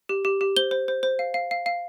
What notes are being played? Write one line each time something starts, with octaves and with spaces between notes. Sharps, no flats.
G4
G4
G4
C5 G7
C5
C5
C5
F5
F5
F5
F5